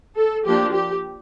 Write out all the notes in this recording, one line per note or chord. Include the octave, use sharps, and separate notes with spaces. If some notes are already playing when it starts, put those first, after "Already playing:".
A4
F3 A#3 D4 G4
G4